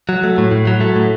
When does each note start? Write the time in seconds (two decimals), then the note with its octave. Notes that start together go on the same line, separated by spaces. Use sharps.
0.09 F#3
0.23 A3
0.38 A2
0.51 A2
0.67 F#3
0.81 A3
0.96 A2